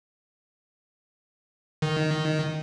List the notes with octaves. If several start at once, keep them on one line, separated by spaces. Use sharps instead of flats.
D#3